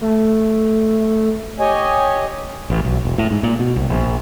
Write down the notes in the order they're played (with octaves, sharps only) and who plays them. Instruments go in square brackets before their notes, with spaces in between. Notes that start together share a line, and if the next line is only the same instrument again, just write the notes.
[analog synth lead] A3
[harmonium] G4 C#5 D#5 G#5
[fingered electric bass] A1
B1
E1
A2
G#2
A#2
B2
C2
A#1